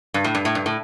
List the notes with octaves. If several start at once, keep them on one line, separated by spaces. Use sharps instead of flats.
G2
A2
G2
A2
G2
A2